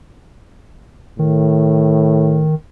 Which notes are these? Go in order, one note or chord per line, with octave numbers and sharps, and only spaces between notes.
A2 D#3